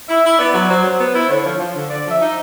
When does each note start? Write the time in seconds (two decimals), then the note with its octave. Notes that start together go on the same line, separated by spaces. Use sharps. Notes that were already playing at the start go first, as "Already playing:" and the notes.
0.08 E4 E5
0.23 E4
0.38 B3 D5
0.53 F#3
0.69 F#3 C5
0.84 F#3
0.99 B3
1.14 E4
1.29 D3 C#5
1.44 F3
1.59 F3 C5
1.74 D3
1.90 D3 D5
2.05 F3 E5
2.20 D#4